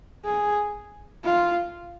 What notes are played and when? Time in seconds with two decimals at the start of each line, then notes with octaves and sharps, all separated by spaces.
0.25 G#4
1.24 F4